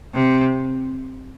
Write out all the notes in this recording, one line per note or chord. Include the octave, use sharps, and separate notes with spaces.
C3